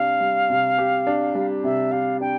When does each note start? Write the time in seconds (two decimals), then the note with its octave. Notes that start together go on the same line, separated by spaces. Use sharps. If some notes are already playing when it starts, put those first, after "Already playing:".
Already playing: C3 G3 D4 G4 F5
0.20 G3
0.50 C3
0.78 G4
1.07 D4
1.35 G3
1.64 C3 E5
1.92 G4 F5
2.21 D4 G5